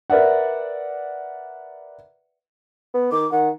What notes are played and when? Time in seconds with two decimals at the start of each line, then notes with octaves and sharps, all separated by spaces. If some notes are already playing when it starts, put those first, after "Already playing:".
0.10 A#4 B4 D5 E5 F#5
2.94 B3
3.12 D#3 D6
3.32 D#3 F#5